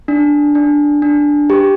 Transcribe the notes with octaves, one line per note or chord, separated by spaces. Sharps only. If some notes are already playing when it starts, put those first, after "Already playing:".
D4
D4
D4
G4